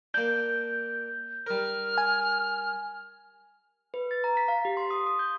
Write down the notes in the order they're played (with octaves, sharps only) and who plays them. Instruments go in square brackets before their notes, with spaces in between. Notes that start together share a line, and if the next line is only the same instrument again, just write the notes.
[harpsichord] A#3 D4 [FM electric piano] G6
[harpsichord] G3 A#4 [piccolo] F6
[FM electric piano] G#5
[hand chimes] B4
A6
A#5
B6
F5
G4
C6
D#6
D#6
G6